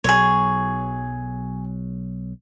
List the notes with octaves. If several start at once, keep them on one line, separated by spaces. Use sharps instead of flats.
B1 F#3 G#4 C#5